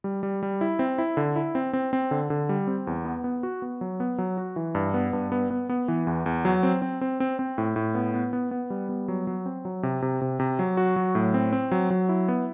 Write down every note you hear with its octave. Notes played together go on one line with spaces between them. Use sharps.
G3
G3
G3
E4
C4
E4
D3
E4
C4
C4
C4
D3
D3
G3
C4
E2
B3
B3
F#4
B3
F#3
B3
F#3
F#4
E3
G2
B3
G2
B3
B3
B3
E3
E2
E2
F#3
C4
C4
C4
C4
C4
A2
A2
B3
B3
B3
B3
G3
B3
F#3
F#3
C4
F#3
C3
C3
C3
C3
F#3
F#4
F#3
A2
C4
C4
F#3
F#3
E4
B3